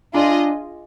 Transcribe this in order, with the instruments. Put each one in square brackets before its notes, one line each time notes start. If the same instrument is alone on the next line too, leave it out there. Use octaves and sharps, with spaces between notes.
[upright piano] D4 [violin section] F4 G#4 D#5